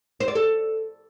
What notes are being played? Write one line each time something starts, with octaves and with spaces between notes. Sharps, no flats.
C5
D5
A4